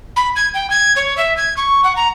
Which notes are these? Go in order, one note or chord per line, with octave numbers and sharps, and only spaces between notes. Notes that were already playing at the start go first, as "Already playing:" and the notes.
B5
G#6
G5
G#6
C#5
E5
G#6
C#6
F#5
A#5